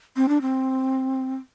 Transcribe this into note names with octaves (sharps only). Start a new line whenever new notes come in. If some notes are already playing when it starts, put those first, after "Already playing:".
C4
D4
C4